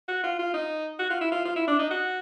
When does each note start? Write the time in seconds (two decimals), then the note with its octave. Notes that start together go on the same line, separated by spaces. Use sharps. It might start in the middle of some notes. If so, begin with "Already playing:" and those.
0.08 F#4
0.24 F4
0.39 F4
0.54 D#4
0.99 F#4
1.10 F4
1.21 E4
1.32 F4
1.45 F4
1.56 E4
1.68 D4
1.79 D#4
1.91 F#4